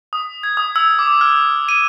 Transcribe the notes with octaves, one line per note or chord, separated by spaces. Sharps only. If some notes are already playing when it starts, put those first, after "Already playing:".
D#6
G#6
D#6
E6
D6
F6
D#7